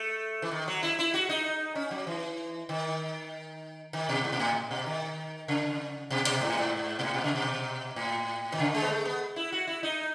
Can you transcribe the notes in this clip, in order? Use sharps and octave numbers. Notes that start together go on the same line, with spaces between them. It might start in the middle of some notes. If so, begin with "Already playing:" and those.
Already playing: A3
E3
D#3
F#3
E4
E4
F#4
D#4
C#4
F#3
E3
D#3
D#3
B2
G#2
B2
A2
B2
D#3
C#3
B2
B2
G#2
A2
G#2
B2
A2
B2
C#3
B2
A2
D#3
C#3
G#3
B3
A3
B3
E4
F#4
E4
D#4